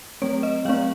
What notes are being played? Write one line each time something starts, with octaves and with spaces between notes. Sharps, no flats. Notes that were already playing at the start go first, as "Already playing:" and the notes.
F#3 A3 C4 C#5
D#5
F#3 A3 C4 F5